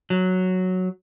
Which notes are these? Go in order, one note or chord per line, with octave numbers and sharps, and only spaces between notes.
F#3